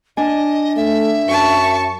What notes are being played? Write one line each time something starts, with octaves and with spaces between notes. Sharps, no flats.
D4 D#5 G#5
A3 E5
F#2 A5 C#6